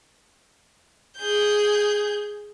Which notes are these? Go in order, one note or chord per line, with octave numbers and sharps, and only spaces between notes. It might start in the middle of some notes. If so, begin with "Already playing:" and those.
G#4 G6